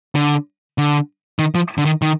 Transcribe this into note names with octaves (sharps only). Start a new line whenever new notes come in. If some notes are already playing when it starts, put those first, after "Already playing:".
D3
D3
D#3
F3
D3
D#3
D#3